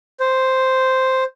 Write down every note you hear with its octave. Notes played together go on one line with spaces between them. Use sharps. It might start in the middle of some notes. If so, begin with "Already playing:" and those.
C5